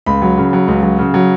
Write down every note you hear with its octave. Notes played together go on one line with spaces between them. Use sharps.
C#2 B5
F#3
C#3
F#3
C#2
F#3
C#3
F#3